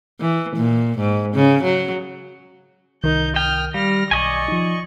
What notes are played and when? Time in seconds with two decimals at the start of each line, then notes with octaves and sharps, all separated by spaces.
0.20 E3
0.56 A#2
0.98 G#2
1.34 C#3
1.63 F#3
3.04 C2 D#3 D#4 A#4 G6
3.36 G5 D#6 F6
3.74 G3 F5 F6 A#6
4.11 B1 D5 D#5 G#5 C#6
4.48 F3 D#4